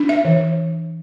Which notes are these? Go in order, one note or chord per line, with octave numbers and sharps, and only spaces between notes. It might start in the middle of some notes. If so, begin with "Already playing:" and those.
Already playing: D4
E5
E3